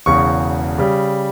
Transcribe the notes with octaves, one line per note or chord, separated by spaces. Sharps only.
E1 E2 C#3 C#6
C#3 G3